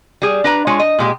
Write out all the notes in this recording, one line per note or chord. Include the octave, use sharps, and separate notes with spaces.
G3 G#4
D4 B4 A#5
G#3 F4 C#5
D#5
A#2 G#3 G4